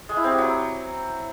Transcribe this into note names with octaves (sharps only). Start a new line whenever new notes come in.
G#3
E4
C4
G4
F#3